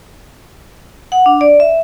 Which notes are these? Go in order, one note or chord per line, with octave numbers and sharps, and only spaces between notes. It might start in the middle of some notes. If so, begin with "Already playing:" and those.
F#5
D4
D5
E5